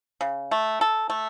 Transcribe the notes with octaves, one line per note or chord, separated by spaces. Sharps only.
C#3
A3
A4
A3